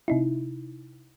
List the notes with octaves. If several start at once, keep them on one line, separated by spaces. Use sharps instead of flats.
C3 D#4 E4